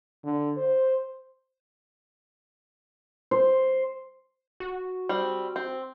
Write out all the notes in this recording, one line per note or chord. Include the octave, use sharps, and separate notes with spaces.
D3
C5
C5
F#4
G3 C4
C4